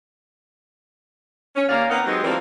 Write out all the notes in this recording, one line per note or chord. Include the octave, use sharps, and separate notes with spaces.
C#4
D#2 A#3 C#4 D5 F5
A#3 C4 D#4 A#4 B4 F#5
F#3 G#3 B3 C4 D#4 G4
E3 F3 G3 A#3 C4 A#4